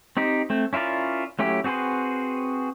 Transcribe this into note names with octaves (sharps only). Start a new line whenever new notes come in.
C4 D#4 G4
A3 C4
C#4 E4 F4 A#4 D5
F#3 A3 C#4 E4 G4
C4 F#4 G#4 B4 C5